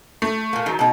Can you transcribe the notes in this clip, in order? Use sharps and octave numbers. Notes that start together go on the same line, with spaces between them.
A3
A#2 A#3
D#3 F#3
B2 D#4